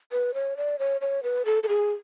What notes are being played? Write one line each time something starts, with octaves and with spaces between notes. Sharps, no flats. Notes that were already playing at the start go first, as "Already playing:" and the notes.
B4
C#5
D5
C#5
C#5
B4
A4
A4
G#4